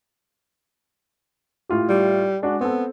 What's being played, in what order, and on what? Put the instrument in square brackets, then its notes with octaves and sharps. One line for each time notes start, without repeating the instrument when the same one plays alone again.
[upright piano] A2 F4 G4
[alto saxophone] G3
[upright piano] G#3 D4 F#4
[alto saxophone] B3 [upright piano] C4 A4